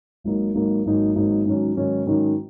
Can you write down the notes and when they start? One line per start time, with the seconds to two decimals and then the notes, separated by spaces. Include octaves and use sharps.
0.24 G#1 G#2 F#3 A#3 D#4
0.54 G#1 G#2 F#3 A#3 D#4
0.85 G#1 G#2 F#3 A#3 D#4
1.15 G#1 G#2 F#3 A#3 D#4
1.46 G#2 D#3 F#3 C#4
1.76 G#2 D#3 F#3 C#4
2.06 G#2 D#3 F#3 C#4